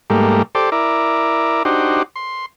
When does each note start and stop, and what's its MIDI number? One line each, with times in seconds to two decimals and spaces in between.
0.10 0.42 44
0.10 0.42 55
0.10 0.42 57
0.10 0.42 58
0.55 0.70 67
0.55 0.70 69
0.55 0.70 72
0.55 0.70 74
0.72 1.63 64
0.72 1.63 70
0.72 1.63 74
1.65 2.03 62
1.65 2.03 63
1.65 2.03 66
1.65 2.03 67
1.65 2.03 72
2.16 2.46 84